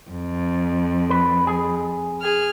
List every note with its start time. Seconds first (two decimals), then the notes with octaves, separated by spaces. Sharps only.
0.11 F2
1.10 B4
1.47 G#4
2.21 G#4 F6